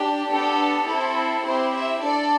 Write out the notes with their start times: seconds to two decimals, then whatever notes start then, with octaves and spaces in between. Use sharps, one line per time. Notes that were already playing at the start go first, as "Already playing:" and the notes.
Already playing: D4 G4
0.30 B3 D4 G4 A4
0.88 C4 E4 A4
1.45 C4 E4 G4 C5
1.74 E5
2.03 D4 A4 D5